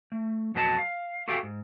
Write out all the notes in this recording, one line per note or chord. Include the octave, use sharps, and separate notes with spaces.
A3
F2 B2 F#3 B4 D#5 A5
F5
F#4 G4 A4 E5 F5 G5
G#2